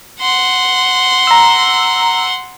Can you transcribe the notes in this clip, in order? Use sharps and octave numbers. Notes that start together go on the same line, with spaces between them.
F#5 C6
A#5 E6